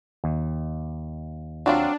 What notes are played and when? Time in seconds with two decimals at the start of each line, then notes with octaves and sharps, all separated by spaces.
0.24 D#2
1.66 F#3 C4 D4 F4